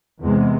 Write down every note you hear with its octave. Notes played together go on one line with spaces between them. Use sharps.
E2 C3 G#3